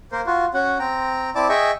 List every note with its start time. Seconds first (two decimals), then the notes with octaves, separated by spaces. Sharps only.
0.12 A#3 A#4 C5
0.26 F4 F#4
0.54 C#4 F#4 F#5
0.79 C4 G5 A#5
1.35 C4 E4 D5 A5 D6
1.49 G#4 D#5 E5 G5 C#6